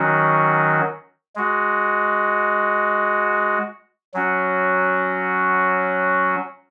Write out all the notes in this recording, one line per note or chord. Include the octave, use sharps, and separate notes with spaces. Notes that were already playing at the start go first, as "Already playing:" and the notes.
Already playing: D#3 F#3 C#4 F#4
G#3 F#4
F#3 C#4 F#4